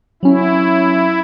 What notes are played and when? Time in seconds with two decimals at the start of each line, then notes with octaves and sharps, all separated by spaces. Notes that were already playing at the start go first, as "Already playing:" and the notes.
0.23 F#3 C#4 E4